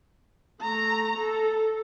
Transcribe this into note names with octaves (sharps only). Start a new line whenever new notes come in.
A3 A#5
A4